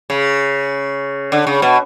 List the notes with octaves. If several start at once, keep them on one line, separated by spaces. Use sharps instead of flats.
C#3
D3
C#3
B2